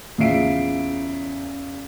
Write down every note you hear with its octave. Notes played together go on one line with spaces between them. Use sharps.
E2 C#3 F4 E5 C7 D7